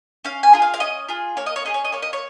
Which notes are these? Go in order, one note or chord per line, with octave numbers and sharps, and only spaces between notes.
C#4 F5
G#5
F4 G#4
F5
F5
C#4 D#5
F4 G#4
A#3 C#5
D#5
C#5
C#4 G#4 D#5
C#5
D#5
A#3 C#5
D#5
C#5